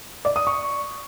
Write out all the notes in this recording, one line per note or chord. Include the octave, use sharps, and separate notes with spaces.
D5
D#6
C#6